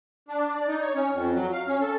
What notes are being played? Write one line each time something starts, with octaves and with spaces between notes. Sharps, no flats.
D4
D5
D#4
C#5
C#4
F2
F#3
F5
C#4
A4